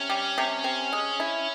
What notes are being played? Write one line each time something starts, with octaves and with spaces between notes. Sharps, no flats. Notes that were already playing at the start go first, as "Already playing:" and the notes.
Already playing: C3 C#4
G3
C3
C4
G#3
E4